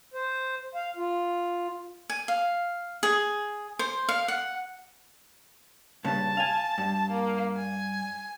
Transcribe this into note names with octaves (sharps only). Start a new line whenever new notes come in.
C5
F5
F4
G#5
F5
G#4
C5
F5
F#5
G2 A#2 C#3 A5
F5 G#5
G2
A#3
G#5